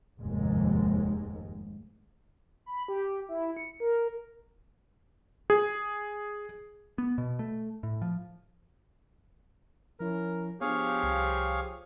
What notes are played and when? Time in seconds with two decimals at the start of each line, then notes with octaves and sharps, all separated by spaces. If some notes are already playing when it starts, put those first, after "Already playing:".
0.20 F1 D#2 G#2 G#3
2.66 B5
2.88 G4
3.29 E4
3.57 C#7
3.80 A#4
5.50 G#4
6.98 B3
7.18 B2
7.39 A3
7.83 A2
8.02 F3
10.00 F3 C#4 E4 A#4
10.61 F3 B3 D4 G4 G#4 C#5 F5
11.03 C2